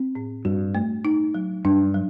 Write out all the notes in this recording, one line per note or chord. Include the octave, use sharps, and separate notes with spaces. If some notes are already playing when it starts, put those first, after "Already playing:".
Already playing: C4
A2
G2 F#4
A3
D#4
F#3
G2 D4
F#3